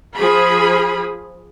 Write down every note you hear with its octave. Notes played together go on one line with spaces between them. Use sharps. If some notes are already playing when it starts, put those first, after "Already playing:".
F3 G#4 B5